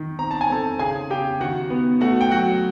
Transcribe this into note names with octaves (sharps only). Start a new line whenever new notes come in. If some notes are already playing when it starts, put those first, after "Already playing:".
Already playing: D#3
C4 A#5
A5
G#5
C4 A4 A5
C#3 G#4 G#5
C#3 G4 G5
D#3 F#4 F#5
B3
A3 F#4 F#5
G5
F#3 F#4 F#5